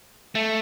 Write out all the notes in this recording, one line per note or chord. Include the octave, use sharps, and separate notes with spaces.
A3